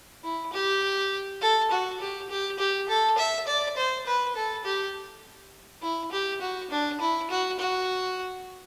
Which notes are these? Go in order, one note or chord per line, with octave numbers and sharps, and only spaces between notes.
E4
G4
A4
F#4
G4
G4
G4
A4
E5
D5
C5
B4
A4
G4
E4
G4
F#4
D4
E4
F#4
F#4